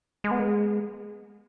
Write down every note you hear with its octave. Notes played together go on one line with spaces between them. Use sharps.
G#3
B3
G#3